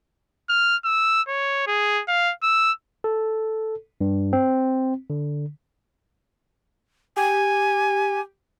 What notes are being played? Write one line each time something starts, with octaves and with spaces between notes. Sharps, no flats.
F6
E6
C#5
G#4
F5
E6
A4
G2
C4
D3
G4 G#5